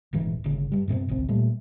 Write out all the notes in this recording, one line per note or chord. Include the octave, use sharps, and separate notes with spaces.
D#1 G#2 E3
G1 C#3
G2 G3
G2 B2 A#3 C4
D1 G#1 C#2 C4
A#2 G3 A3